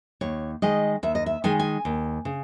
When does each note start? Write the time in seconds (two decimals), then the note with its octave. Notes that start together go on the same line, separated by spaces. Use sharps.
0.21 D#2 C#5
0.62 D#3 G#3 D#5
1.03 D#2 E5
1.15 D#5
1.26 E5
1.44 D#3 G#3 G#5
1.59 G#5
1.85 D#2
2.25 C#3